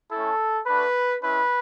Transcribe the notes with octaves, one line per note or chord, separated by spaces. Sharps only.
A3 C#4 E4 A4
A3 D4 F#4 B4
G#3 C#4 E4 B4